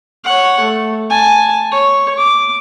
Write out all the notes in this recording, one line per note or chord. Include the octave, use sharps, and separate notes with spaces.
C#5 F#5
A3
G#5 A5
C#5
D6